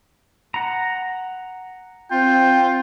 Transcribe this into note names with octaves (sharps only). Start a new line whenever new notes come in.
F#5 A#5
C4 F4 G5